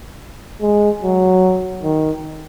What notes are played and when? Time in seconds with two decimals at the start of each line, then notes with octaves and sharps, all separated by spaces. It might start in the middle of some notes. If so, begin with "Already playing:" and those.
0.62 G#3
1.02 F#3
1.83 D#3